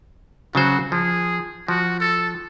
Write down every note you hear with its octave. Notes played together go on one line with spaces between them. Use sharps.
C#3 F#3 F#4 C5
F3 G#4
F3 F#4
A4